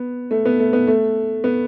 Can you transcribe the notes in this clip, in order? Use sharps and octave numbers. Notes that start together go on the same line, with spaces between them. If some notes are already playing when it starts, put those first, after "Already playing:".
Already playing: B3
A3
B3
A3
B3
A3
B3